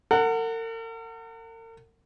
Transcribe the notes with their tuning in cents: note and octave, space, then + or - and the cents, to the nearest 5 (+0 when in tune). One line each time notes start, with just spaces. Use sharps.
A#4 -45 F#5 +0